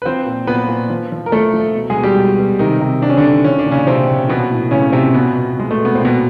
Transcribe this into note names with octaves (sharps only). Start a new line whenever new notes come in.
B4
F3 C4 C5
A#2
A#2 B3 B4
A#2
F3
F3
A#4
F3 A3 A4
F3
B2
G#3 G#4
B2
G3 G4
B2
B2
C3 D#3 D#4
C3
C3 D4
C#4
D3 D4
D#3
F3 C#4
D4
A#2
C#3 C#4
C3 F3 C4
A#2
B2 F3 B3
A2
A2 C#3 C#4
C3 F3 C4
B2 B3
B2
B2 G#3
A3
B2
B3
A#2 C4
B2 B3